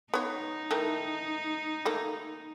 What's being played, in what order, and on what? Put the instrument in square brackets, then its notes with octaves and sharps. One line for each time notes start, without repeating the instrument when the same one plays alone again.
[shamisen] B3 C#5 [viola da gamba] D#4
[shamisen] D#3 E3 A3
D#3 A3 A#3